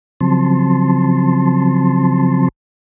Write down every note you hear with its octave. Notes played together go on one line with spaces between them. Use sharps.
C#3 F3 F#3 C4 A5 C6